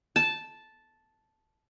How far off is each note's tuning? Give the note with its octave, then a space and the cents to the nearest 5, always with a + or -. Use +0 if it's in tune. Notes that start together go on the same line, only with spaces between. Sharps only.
A5 -5